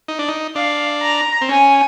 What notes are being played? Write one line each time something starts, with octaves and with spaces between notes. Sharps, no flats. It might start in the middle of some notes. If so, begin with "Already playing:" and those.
D#4
D4
D#4
D4 F5
A#5
C4
C#4 G#5